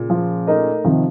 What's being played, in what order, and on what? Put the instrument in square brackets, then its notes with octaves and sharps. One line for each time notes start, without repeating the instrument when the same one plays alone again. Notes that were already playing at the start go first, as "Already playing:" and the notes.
Already playing: [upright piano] A#2 C#3
[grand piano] F3
A3 D#4 A#4 D#5
[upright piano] C3 D#3 [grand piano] F3